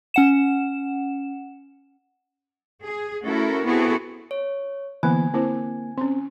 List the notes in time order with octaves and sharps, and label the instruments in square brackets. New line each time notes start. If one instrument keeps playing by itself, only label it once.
[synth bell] C#4 F#5 E7
[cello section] G#4
A3 C#4 E4 F#4 A4 A#4
B3 C4 E4 F#4 G#4 A4
[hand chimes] C#5
[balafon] D3 A#3 [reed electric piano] E3 B3 [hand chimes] G#5
[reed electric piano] A#3 [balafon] C4 E4 C5
[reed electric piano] C4 [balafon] C#4 C6